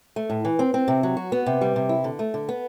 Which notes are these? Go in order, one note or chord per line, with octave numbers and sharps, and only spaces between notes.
A3
A2
E3
C4
C4
C3
F#3
F#4
B3
C3
G3
C3
E4
D3
A3
D3
B3